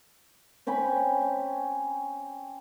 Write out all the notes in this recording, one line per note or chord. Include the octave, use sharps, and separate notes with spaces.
C4 C#4 G5 B5